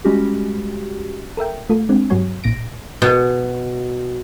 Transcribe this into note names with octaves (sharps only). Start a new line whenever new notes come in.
G3 G#3 C#4 F#4 G4
A4 A#4 E5 G5
A3 F4 A4
G#3 C4 D4
G2 F#3 G3 F#4 C#5 G#5
A1 A#2 A#6 D7
B2